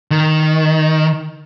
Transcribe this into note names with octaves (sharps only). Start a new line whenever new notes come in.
D#3